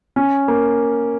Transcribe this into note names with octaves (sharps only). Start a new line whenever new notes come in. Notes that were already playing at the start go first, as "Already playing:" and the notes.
C#4
A#3